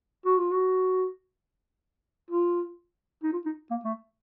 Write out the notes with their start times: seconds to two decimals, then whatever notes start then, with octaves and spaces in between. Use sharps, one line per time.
0.26 F#4
0.38 F4
0.51 F#4
2.30 F4
3.23 D#4
3.33 F4
3.45 D#4
3.71 A#3
3.84 A3